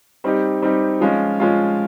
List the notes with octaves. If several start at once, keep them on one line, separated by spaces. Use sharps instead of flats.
G3 C4 D#4 G4
G3 C4 D#4 G4
F3 G#3 C#4 F4
F3 G#3 C#4 F4